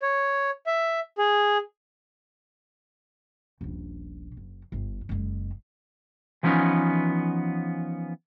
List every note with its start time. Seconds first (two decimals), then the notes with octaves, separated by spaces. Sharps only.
0.02 C#5
0.66 E5
1.18 G#4
3.61 D#1 A#1
4.37 F#1
4.72 G1
5.09 F#1 G#3
6.43 E3 F3 A#3 B3 C#4 D#4